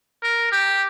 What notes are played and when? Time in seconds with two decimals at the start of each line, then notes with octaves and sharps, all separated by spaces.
0.23 A#4
0.52 G4